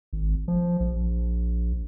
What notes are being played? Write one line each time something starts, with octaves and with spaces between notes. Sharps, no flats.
G#1
F3
A#1